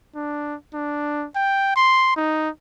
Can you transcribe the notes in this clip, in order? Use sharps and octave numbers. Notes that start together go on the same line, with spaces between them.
D4
D4
G5
C6
D#4